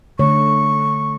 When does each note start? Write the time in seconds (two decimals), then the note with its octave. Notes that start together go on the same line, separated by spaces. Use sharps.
0.19 D3 A3 C#5 C#6